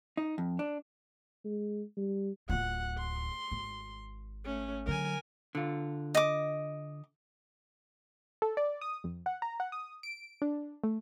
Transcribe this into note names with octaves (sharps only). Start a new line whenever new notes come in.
D#4
F2
D4
G#3
G3
D1 F4 F#5
C6
G#1
A3 C#4
D3 F#3 A#4 G#5
D3 F4
D#5 D6
A4
D5
D#6
F2
F#5
A#5
F#5
D#6
D7
D4
A3